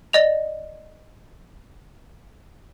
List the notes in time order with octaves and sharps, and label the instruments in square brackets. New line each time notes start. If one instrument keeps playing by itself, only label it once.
[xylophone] D5 D#5 F7